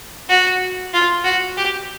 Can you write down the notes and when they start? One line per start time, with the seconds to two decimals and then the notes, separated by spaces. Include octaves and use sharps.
0.29 F#4
0.93 F4
1.24 F#4
1.57 G4